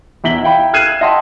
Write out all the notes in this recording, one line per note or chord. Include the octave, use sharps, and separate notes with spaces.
E2 E4 A#5 B6 F#7 G7
E4 F5 G5 B5
F6 F#6 G#6 C7 D#7 E7
D#5 E5 F#5 G5 A5 C6